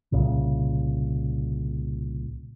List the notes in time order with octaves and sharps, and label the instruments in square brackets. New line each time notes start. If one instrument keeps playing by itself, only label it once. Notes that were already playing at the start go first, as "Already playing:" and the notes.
[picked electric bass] C2 A#2 C#3